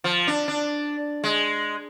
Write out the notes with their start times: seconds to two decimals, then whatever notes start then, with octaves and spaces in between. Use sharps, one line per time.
0.04 F3
0.27 D4
0.48 D4
1.24 G#3